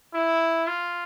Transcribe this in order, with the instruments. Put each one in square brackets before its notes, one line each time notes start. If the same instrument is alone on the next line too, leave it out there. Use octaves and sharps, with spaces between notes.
[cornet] E4
F4